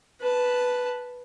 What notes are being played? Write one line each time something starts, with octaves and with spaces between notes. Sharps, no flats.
B4 A5